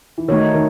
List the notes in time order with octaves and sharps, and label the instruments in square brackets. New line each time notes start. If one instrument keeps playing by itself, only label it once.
[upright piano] E3
[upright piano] D#3 [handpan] A3 D#4 F#4 C#5
[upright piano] D#3